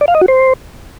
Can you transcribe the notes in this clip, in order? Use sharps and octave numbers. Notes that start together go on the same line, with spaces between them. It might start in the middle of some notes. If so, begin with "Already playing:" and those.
D5
F5
D#5
F#4
C5